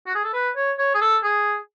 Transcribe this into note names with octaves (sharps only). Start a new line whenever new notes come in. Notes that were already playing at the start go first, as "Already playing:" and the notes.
F#4
G#4
A4
B4
C#5
C#5
G#4
A4
G#4